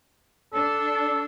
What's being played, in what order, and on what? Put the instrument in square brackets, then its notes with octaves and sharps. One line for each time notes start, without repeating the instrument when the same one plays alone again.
[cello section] D4 [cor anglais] A4